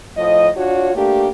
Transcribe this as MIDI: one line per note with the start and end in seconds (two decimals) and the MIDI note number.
0.16 0.49 45
0.16 0.49 53
0.16 0.49 75
0.55 0.92 62
0.55 0.92 65
0.55 0.92 66
0.55 0.92 73
0.94 1.27 57
0.94 1.27 58
0.94 1.27 62
0.94 1.27 67